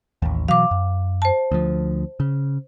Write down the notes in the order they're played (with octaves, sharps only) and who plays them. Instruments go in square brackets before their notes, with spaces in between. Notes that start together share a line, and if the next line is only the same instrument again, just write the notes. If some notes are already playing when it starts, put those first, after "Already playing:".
[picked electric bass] A1 D#2
[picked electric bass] B2 E3 F#3 [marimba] F5 D6
[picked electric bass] F#2
[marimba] C5 A5
[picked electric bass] D2 F3
C#3